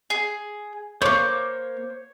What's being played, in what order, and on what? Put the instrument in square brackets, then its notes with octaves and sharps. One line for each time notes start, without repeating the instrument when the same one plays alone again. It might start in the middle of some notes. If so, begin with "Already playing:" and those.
[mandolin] G#4
[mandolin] A3 A#3 [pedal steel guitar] C5 C#6 D6 [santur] C#5